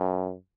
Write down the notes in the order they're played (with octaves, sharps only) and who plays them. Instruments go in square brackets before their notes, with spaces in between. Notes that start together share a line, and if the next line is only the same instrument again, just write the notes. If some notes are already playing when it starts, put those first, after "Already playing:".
Already playing: [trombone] F#2